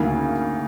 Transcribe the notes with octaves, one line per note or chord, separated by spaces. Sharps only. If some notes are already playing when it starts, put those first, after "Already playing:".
Already playing: D2 C#3 A#3 D#4